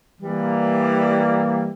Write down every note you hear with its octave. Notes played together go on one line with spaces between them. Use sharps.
E3 G3 A#3